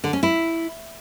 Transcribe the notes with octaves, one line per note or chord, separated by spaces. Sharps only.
D3
C#4
E4